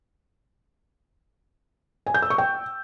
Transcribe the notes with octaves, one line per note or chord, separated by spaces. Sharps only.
G#5
G6
E6
C#6
G5